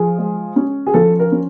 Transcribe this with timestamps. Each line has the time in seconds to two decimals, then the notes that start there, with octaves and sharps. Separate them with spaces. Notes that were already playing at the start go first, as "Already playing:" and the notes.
Already playing: F3 G#4
0.18 G#3
0.56 C#4
0.87 G#4
0.94 F3 A4
1.19 A#4
1.32 C#4